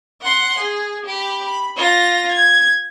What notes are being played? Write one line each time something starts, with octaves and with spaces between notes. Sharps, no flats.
F#5 C6
G#4
G4 B5
B5
F4 A#6
G#6